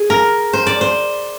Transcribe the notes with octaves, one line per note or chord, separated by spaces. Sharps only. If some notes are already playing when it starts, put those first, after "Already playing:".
Already playing: G#4
A#4
C5
D5
C5